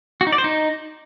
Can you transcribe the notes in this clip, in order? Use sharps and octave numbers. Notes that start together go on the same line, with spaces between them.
F#4
D#4
D5
C5
D#4